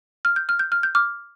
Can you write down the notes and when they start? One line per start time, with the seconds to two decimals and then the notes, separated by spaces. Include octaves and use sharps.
0.25 F6
0.36 G6
0.49 F6
0.59 G6
0.72 F6
0.83 G6
0.95 D6 F6